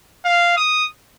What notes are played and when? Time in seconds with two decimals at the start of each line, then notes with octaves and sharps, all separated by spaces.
0.25 F5
0.57 D#6